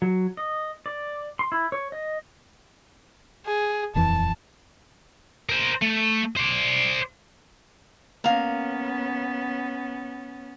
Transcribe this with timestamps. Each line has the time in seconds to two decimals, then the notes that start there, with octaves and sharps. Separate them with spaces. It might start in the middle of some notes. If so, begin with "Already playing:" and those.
0.02 F#3
0.37 D#5
0.86 D5
1.39 C6
1.52 E4
1.72 C#5
1.92 D#5
3.46 G#4
3.95 D#1 F2 E3 A5
5.49 A#4 C5
5.82 A3
6.37 C5 D5
8.24 A#3 B3 C#4 F5